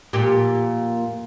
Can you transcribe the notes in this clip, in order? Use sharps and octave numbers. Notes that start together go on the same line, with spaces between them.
F2 A#2 G4